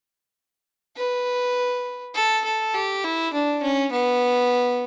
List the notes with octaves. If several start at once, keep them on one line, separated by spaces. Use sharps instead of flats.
B4
A4
A4
G4
E4
D4
C#4
B3